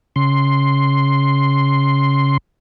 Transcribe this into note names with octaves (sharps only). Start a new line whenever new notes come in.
C#3 C6